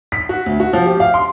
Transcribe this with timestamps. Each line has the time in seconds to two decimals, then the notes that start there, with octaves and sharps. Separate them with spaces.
0.12 B6
0.29 F#4
0.46 D2
0.60 F#4
0.73 F3
0.86 G4
1.00 F5
1.14 C6